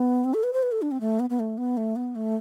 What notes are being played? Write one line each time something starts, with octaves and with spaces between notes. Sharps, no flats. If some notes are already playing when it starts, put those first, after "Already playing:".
Already playing: B3
C4
A4
B4
C5
B4
A4
D4
C4
A3
B3
B3
A3
B3
A3
B3
A3